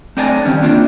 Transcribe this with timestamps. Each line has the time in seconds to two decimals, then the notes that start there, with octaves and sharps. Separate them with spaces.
0.17 A3 C4 D5 D#5 G#5 A5
0.45 D#3 G3 C4 C#4
0.63 A#3 D4 F4 D5